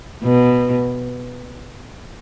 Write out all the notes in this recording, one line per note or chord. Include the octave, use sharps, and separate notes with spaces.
B2